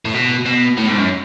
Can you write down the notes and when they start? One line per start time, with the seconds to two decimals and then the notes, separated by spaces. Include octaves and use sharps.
0.05 A2
0.14 B2
0.45 B2
0.77 A2
0.87 G#2
0.98 F#2